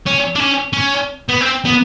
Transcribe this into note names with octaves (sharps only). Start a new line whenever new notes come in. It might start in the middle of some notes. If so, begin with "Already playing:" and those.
C#4
D4
C#4
C#4
B3
C4
B3